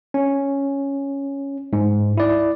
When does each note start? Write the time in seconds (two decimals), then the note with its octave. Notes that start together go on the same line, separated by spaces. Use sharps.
0.14 C#4
1.73 G#2
2.17 E4 D5